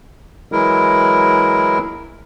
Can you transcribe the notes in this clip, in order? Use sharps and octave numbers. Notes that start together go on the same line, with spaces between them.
E3 F#3 G#3 E4 A#4